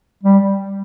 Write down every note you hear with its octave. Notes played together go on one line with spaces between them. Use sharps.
G3